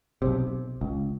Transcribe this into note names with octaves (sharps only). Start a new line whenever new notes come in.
B1 C3
C#2